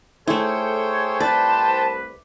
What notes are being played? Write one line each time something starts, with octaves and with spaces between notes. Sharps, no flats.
A3 E4 G#4 A4 C5 C#5 G5 C6
C2 B4 D5 A5